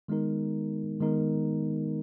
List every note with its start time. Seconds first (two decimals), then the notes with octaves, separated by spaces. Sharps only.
0.08 D#3 G#3 B3 D#4 A#4
1.00 D#3 G#3 B3 D#4 A#4